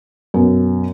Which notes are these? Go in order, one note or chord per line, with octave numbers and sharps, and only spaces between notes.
F#2 B2